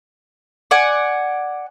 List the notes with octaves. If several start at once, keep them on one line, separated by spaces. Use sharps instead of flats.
D5 F#5 G#5